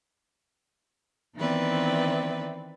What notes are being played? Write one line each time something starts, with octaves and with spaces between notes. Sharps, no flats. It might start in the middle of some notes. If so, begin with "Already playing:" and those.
D#3 E3 B3 C4 B4 D5